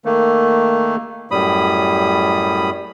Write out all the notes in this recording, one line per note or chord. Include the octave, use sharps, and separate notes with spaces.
D#3 A3 A#3
F#2 A2 G3 B5 D#6